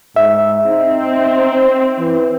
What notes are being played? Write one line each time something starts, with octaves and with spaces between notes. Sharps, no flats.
G#2 E5
C4 D#4
E3